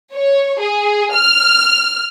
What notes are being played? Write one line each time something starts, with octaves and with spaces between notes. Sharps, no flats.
C#5
G#4
F6